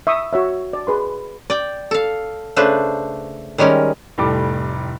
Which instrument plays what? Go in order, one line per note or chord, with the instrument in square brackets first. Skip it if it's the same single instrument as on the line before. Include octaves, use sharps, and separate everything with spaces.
[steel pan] E5 C#6 D#6
F#4 C#5 E5
D5
G#4 B4 C6
[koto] D5 G5
A4 F5
C#3 A3 D4 B4 C5
D#3 G3 G#3 C#4 A#4
[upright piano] F1 A2 G3 A4 D6